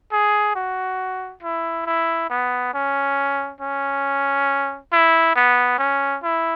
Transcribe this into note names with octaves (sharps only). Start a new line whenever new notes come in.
G#4
F#4
E4
E4
B3
C#4
C#4
E4
B3
C#4
E4